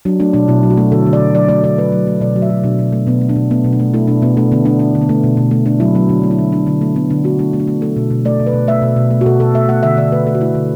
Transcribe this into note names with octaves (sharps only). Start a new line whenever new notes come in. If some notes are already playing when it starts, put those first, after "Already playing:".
F#3 D4
A3 D4
B2 D4
B2 E4
F#3
F#4
A3
D3 A4
D3
D5
D3
F#3 D5
A3 D5
D3 D5
F#3 B4
F#3
A3
B2 D5
F#3
E5
F#3
B2 D4
B2
A3
B2 B3
A3
D4
B2
A3 B3
B2
D4
A3
A3 E4
B2 D4
B2 B3
A3 D4
D3 B3
A3 D4
D3 D4
D3
B3
A3
B2
B2
A3
A3 D4
F#3 E4
F#3 B3
D3 D4
A3
E4
D3
F#3 D4
D3
A3
A3 B3
D3 D4
A3 F#4
A3 D4
A3
D4
A3
A3 A4
B2
B2
A3 D5
B2
B4
B2
A3 E5
B2
B2
A3
F#4
B2 A4
B2 A4
A3 E5
A3 F#5
D3 E5
D3 D5
A3 B4
A3 A4
F#4
A3 E4
D3